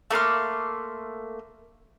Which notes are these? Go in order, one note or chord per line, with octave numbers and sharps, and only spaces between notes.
A3 A#3 C6 F6